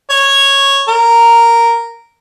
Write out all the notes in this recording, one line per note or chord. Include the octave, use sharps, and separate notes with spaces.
C#5
A#4